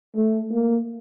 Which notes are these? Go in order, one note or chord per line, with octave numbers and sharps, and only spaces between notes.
A3
A#3